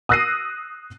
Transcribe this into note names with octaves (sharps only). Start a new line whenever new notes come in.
D#6 E6 F#6 A#6 C7 D#7